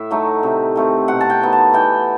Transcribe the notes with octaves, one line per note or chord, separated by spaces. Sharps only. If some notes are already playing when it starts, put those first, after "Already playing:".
Already playing: A2 E5
F#3 A3 D#4
C3
D#3 A3 C4
B2 F#5
A5
G5
F#3 B3 D#4
A5
E3 G5